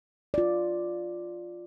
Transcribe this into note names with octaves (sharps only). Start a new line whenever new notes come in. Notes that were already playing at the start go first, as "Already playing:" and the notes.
F4 D5